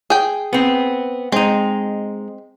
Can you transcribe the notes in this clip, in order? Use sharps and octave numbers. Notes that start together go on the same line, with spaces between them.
G#4 G5
B3 C4
G#3 C4 D#4